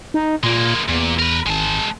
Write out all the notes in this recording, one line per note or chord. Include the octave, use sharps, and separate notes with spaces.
D#4
A#2 G#3 A#3
E2 A#2
A#4 B4
G#1 G#3 A5